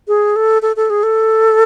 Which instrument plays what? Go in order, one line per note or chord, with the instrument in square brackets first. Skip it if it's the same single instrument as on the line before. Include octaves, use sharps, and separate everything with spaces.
[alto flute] G#4
A4
A4
A4
G#4
A4